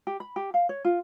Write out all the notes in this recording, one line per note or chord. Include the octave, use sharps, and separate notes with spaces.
G4
B5
G4
F5
C#5
F4